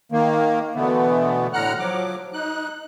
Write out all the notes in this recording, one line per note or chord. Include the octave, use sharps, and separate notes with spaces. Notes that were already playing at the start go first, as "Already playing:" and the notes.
D#3 A#3
B2 D3 E3 A3 B3
A2 D3 F#5 A#5 F6 F#6
F3 F#3 D6
D#4 F#6